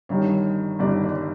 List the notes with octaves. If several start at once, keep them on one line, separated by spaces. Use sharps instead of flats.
G1 G2 D#3 C#5
G1 G2 D#3 D5
D5